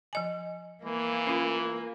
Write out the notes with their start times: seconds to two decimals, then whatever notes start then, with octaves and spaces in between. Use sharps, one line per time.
0.13 F3 D#5 G#5
0.84 E3 A#3
1.27 C#4 F4